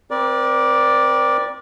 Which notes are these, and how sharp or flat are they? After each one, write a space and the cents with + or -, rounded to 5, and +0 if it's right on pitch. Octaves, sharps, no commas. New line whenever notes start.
C4 +0 A#4 +45 D5 +0